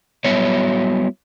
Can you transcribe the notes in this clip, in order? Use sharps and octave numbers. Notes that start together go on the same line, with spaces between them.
F#3 G3 B3 E4 F#4 C#5